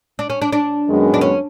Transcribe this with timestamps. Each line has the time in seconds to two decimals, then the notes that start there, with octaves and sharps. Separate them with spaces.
0.19 D4
0.30 C#4
0.42 D4
0.52 D4
0.87 F#2 D#3 G#3 B3
1.14 D4
1.21 C#4